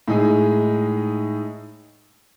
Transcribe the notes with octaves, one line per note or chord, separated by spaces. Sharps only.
A2 G#3 D#4 G#4